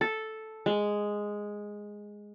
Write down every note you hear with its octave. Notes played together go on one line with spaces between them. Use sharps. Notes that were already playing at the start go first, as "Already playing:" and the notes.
A4
G#3